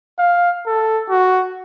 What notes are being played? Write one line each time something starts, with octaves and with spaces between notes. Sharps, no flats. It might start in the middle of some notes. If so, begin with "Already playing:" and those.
F5
A4
F#4